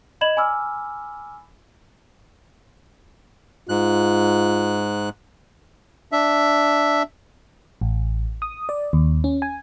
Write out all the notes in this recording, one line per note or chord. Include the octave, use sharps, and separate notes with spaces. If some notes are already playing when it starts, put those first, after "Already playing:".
D5 D#5 B5 G#6 E7 F#7
G#5 B5 D6 E6 F6
G#2 F4 F#6
D4 E5
A1
D#6
D5
D#2
C#4
G#5